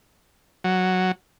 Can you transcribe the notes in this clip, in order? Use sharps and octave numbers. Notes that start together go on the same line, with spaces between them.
F#3